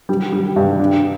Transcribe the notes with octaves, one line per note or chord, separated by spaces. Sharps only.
G3
G3
G2
D4